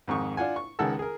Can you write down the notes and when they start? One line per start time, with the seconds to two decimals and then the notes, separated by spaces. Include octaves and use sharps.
0.08 F2 G#2 D#3 C#6
0.37 D4 F4 F#5 G#5
0.56 C#6
0.79 C#2 D#3 G#3 F#5 A5 E6
0.99 G#4 A#4